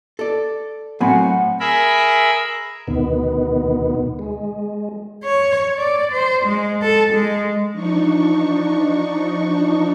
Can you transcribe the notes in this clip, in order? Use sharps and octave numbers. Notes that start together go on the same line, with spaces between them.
A4 D5
A2 F#3 C4 F#5 G#5 B5
G#4 A#4 E5 B5
D2 B2 D#3 B3
G#3
C#5
D5
C5
G#3
A4
G#3
F3 D4 D#4 C#6